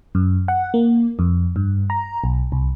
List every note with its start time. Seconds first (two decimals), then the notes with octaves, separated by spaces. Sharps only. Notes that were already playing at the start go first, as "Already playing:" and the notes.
0.15 F#2
0.48 F#5
0.74 A#3
1.19 F2
1.56 G2
1.90 A#5
2.24 B1
2.52 C2